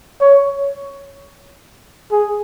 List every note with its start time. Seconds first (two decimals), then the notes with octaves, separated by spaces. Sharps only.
0.21 C#5
2.11 G#4